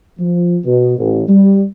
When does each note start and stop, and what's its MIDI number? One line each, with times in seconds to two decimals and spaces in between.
0.20 0.57 53
0.65 0.96 47
0.98 1.22 33
1.28 1.63 55